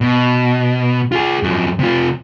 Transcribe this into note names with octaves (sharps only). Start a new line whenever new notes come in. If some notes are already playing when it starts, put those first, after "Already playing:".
B2
F4 G#4
F#2 F3
C3 F4